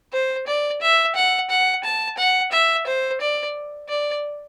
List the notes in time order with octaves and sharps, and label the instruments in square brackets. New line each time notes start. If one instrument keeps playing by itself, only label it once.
[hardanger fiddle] C5
D5
E5
F#5
F#5
A5
F#5
E5
C5
D5
D5